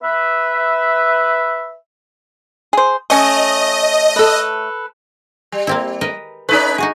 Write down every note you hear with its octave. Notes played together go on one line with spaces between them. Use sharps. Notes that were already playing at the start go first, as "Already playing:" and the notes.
B4 E5
G#4 C5
A3 C#4 D#5
A4 B4
G3
A#3 C4 E4
A#4 B4 D#5
A3 C#4 D#4 B4
D#4 F#4 G#4